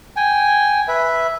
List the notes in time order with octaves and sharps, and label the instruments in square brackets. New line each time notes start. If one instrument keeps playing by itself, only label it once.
[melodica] G5 G#5
B4 E5